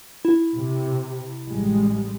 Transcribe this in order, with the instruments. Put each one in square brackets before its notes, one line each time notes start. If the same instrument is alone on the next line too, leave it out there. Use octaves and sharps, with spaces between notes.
[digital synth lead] E4
[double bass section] C3
A1 G3 G#3